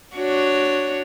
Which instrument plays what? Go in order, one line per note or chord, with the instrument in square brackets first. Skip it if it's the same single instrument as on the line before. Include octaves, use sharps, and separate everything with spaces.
[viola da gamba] D4 F#4 C#5